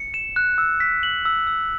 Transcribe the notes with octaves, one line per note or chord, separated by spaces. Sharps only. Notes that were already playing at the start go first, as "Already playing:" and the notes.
Already playing: C#7
E7
F#6
E6
B6
F#7
E6
E6